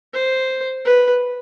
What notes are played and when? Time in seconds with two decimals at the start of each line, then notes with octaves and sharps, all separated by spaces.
0.13 C5
0.85 B4